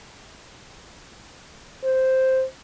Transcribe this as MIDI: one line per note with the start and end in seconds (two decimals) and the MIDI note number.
1.84 2.44 72